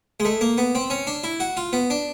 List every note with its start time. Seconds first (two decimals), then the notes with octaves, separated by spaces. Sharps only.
0.20 G#3
0.25 A3
0.41 A#3
0.58 B3
0.75 C4
0.90 C#4
1.07 D4
1.24 E4
1.40 F#4
1.57 F4
1.73 B3
1.90 D4